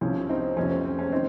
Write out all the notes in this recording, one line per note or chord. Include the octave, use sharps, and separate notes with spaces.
C2 C3 F3 C#4
C4 D#4
F1 F2 C3 F3 C#4
C4
C4
C#4
D#3 C4 D#4